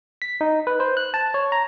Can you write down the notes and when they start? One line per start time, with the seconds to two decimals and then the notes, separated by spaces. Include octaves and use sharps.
0.22 B6
0.41 D#4
0.67 B4
0.80 C5
0.97 F#6
1.14 A5
1.34 C#5
1.52 A#5